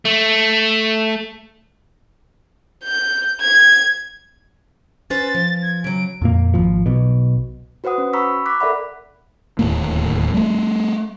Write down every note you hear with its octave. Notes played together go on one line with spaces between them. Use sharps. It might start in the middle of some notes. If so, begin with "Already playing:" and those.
A3
G6
G#6
C#4 B4 C5 A6
F3
G#6
C#3 F#3 D7
F2 A#2 A#3
G#1 F3
B1 B2
F#4 B4 C5 F#5 D#6
C#4
A#5 B5 C#6 E6 B6
D6 F#6 B6
A4 A#4 D5 E5 F#5 B5
D1 D#2 A2 A#3
G3 A3